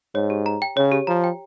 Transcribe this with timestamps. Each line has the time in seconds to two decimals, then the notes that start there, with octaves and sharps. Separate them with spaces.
0.15 G#2 C#5
0.30 G4
0.46 A#5
0.62 G5
0.77 C#3 C#5
0.92 G4
1.07 F3 A#5
1.24 G5